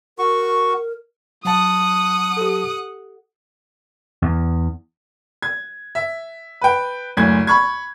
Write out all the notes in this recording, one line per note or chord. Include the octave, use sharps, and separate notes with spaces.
F#4 A#4 C#6
F#3 F#5 A5 D#6
G4 A4
E2
G#6
E5
B4 G5
F#1 D2 G#6
B5 C#6 G#6